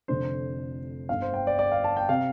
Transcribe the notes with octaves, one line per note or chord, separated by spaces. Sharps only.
F1 F2 D3 C5
G1 G2 D3 F5
C5
G5
D5
D5
F5
A5
G5
C3 F5